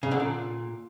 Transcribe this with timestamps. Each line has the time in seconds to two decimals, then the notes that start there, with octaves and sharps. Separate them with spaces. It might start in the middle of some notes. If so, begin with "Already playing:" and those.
0.03 C#3
0.11 D3
0.20 A#2